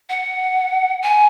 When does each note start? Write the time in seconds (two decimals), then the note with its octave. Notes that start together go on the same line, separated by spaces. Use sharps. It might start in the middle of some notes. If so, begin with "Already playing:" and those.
0.09 F#5
1.03 G#5